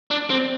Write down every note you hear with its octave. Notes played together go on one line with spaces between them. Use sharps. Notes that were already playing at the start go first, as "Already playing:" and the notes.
D4
C4